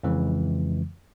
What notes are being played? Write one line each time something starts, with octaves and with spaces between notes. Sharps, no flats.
F2 C#3 E3 G#3